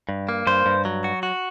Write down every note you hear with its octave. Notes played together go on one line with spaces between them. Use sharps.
G2
A#3
G2 C5
G2
F#3
F#4
F#4